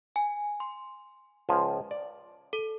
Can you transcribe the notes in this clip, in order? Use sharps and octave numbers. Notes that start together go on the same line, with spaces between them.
G#5
C6
C#2 F3 G#5
D5
A4